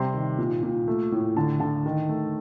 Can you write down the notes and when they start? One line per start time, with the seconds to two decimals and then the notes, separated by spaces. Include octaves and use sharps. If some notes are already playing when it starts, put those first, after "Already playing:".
Already playing: C3 G3 C6
0.14 D#3
0.38 A#2
0.63 A#2
0.88 A3
1.12 A2
1.37 D3 A5
1.60 D3 A5
1.86 D#3
2.09 A3